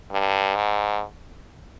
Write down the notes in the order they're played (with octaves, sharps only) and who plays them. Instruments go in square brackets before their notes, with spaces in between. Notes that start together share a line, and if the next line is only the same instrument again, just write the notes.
[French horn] G2
G#2